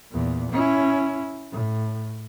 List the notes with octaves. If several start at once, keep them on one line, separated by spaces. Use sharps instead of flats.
E2 A#2
C#4 E4
A2